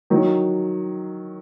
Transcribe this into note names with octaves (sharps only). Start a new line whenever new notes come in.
D#3 F#3